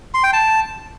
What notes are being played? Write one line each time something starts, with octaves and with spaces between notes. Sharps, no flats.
C6
G5
A5